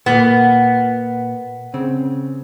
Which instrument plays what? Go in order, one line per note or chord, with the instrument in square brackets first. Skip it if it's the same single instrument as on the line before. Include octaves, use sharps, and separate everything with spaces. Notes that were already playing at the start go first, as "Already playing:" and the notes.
[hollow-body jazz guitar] A#2 A#3 [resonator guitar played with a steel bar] B3
[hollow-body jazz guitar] C#3 C4